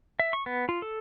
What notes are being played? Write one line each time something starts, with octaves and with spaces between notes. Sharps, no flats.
E5
C#6
B3
F4
A4